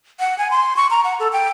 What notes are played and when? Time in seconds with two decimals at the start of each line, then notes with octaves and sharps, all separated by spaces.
0.20 F#5
0.38 G#5
0.50 C6
0.76 C#6
0.90 A#5
1.04 F#5
1.19 A4
1.33 G5